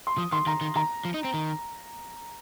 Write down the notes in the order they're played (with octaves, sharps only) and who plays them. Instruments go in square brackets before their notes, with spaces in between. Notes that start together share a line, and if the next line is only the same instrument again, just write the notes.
[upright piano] C6
[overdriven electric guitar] F3 [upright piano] D#6
[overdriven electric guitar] D#3 [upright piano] C6
[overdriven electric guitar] D#3 [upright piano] A#5
[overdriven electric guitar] D#3
[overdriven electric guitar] D#3 [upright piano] A#5
[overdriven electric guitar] F3
D#4
C4
D#3